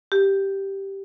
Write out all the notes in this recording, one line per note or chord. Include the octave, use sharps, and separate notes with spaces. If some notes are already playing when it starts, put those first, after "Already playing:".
G4